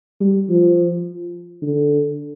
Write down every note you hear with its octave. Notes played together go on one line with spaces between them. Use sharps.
G3
F3
D3